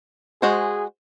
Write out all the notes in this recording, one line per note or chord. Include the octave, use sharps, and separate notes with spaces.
G#3 F#4 G#4 C5